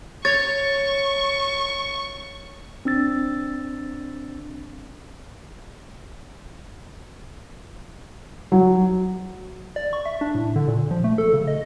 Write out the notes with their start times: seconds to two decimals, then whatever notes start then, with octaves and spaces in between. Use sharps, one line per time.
0.25 C#5 C#6 A6
2.85 C4 D4 E6 A6
8.52 F#3
9.76 D5
9.93 C#6
10.06 E5
10.21 D4
10.35 A2
10.56 D3
10.68 A#2
10.91 F3
11.04 A3
11.18 A4
11.33 C#3
11.48 D#5